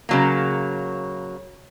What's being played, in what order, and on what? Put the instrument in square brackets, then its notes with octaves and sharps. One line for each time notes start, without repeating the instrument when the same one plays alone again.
[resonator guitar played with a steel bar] C#3 F#3 A#3